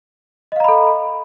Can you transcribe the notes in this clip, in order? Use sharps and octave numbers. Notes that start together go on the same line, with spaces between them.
A4 D#5 F5 A#5 B5